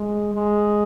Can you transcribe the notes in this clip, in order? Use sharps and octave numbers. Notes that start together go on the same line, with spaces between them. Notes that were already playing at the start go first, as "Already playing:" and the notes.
Already playing: G#3
G#3